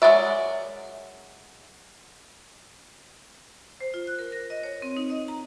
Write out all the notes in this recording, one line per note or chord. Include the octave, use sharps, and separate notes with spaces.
F#3 G#3 A#4 D5 E5
C5
F4
F#6
A#4
A#6
D#5
C#5
C4
D#4
D#5
A#5